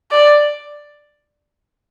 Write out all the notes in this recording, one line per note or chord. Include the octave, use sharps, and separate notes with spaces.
D5